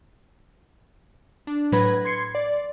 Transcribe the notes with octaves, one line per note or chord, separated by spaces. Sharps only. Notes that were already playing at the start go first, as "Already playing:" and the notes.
D4
A2 F#3 B4 B5 G#6 A#6
C6 G#6 C7 C#7
D5